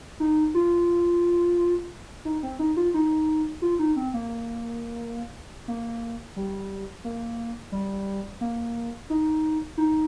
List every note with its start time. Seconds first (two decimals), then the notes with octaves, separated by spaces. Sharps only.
0.20 D#4
0.54 F4
2.25 D#4
2.43 C4
2.59 D#4
2.77 F4
2.94 D#4
3.62 F4
3.79 D#4
3.96 C4
4.14 A#3
5.68 A#3
6.36 G3
7.04 A#3
7.72 G3
8.41 A#3
9.10 D#4
9.77 D#4